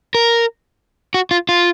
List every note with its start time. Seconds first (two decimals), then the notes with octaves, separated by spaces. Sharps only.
0.15 A#4
1.14 F#4
1.31 F4
1.49 F4